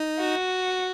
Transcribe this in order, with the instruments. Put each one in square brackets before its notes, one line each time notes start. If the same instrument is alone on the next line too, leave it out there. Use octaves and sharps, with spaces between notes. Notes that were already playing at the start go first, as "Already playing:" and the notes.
Already playing: [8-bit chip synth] D#4
[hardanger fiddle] F#4